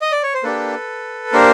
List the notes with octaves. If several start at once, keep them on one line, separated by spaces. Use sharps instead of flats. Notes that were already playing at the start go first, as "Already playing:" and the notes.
D#5
D5
C#5
C5
A#3 D4 G4 A4 B4
A#3 D4 G4 A#4 C5